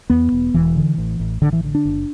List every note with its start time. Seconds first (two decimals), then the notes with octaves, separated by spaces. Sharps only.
0.10 E2 B3
0.32 E1
0.54 E1 E3
0.76 D3
0.98 A1
1.20 A1
1.42 A1 D3
1.53 E3
1.64 D3
1.75 D4
1.85 F#1